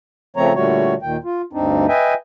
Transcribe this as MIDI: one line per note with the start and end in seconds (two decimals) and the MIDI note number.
0.37 0.53 49
0.37 0.53 53
0.37 0.53 57
0.37 0.53 60
0.37 0.53 73
0.37 0.53 82
0.55 0.94 46
0.55 0.94 50
0.55 0.94 55
0.55 0.94 57
0.55 0.94 66
0.55 0.94 73
1.02 1.17 39
1.02 1.17 46
1.02 1.17 51
1.02 1.17 79
1.24 1.42 65
1.53 1.86 38
1.53 1.86 43
1.53 1.86 60
1.53 1.86 62
1.53 1.86 63
1.88 2.14 71
1.88 2.14 75
1.88 2.14 76
1.88 2.14 79
1.88 2.14 80